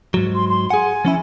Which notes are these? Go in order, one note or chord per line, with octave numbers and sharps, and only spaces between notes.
G#2 F#3
C6
C6
G#4 F#5 G#5
F3 C#4 E4